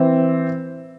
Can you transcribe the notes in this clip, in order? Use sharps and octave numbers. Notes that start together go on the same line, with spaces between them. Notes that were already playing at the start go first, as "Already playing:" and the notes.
Already playing: E3 C4